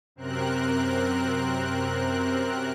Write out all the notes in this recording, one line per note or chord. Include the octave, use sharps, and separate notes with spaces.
F#2 C3 C4 A#4 F#6